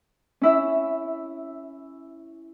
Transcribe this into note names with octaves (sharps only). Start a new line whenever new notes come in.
C#4 E4 E5